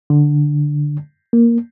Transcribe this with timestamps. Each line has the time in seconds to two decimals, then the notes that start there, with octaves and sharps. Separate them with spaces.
0.10 D3
1.33 A#3